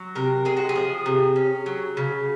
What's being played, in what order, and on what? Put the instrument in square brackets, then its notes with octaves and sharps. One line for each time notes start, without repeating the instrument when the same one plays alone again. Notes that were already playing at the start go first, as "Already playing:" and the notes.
Already playing: [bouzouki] F#3
C3 A#4
G#3 G#4
F#4
G#4
F3
C3
C#4
F#3
C#3